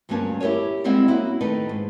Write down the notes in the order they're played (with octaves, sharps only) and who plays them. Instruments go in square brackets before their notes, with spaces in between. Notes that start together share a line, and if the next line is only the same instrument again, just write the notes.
[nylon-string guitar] D2 G2 F#3 A#3 C#4 A5
E4 G4 G#4 A#4 C#5
G3 G#3 C4 E4 D#5 F#5
A#3 C#4 E4 F#4
D#3 A3 D#4 B4
G#2